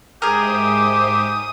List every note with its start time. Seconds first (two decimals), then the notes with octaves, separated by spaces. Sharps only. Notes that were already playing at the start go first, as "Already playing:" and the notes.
0.22 G#2 G4 G#4 A#4 C5 E5 D#6